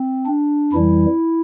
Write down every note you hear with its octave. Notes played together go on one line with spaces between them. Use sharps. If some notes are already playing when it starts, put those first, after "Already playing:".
Already playing: C4
D4
F2 E3 G3 E4